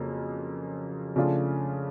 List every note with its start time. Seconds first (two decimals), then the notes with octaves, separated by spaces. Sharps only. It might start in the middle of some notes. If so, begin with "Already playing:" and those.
Already playing: F2 C#3 F#3 A#3
1.16 C#3 F3 A3 D4 F4